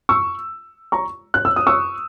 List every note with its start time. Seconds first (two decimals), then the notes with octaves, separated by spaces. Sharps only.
0.09 C#6 E6
0.92 A#5 C#6
1.34 F#6
1.45 E6
1.56 D#6
1.67 C#6 E6